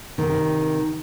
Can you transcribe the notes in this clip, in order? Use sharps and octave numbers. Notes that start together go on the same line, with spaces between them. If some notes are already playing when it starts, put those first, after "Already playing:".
C3 D#3